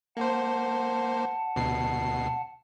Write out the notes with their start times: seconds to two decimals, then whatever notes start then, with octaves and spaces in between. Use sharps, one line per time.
0.17 A#3 C5 F#5 A5
1.56 D2 B2 C7